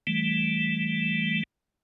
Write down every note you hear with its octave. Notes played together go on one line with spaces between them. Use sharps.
E3 G3 A3